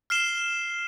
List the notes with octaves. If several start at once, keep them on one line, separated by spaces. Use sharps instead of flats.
F6 C7 E7 G7